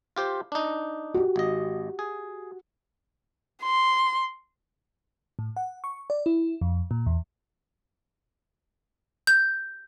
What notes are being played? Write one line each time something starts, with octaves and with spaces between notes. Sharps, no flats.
F4 G4 C5
D4 D#4
F#4 G4
G#1 D#5
G#4
C6
A2
F#5
C#6
D5
E4
F2
A#2
E2
G6